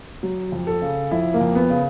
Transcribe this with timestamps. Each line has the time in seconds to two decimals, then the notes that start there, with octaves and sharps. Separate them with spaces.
0.23 F#3
0.52 F2
0.67 A4
0.82 C#3
1.11 F2 E4
1.34 A#3
1.41 F2
1.55 B3
1.70 C#3